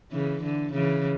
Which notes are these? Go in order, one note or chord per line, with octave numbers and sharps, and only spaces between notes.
C#3 E3
D3
C#3 E3